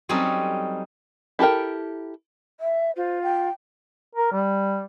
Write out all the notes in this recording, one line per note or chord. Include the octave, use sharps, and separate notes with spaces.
F#3 G3 C4 C#4 D#4 A4
E4 G4 A4 A#4 G5
E5
F4 C5
G5
A#4
G3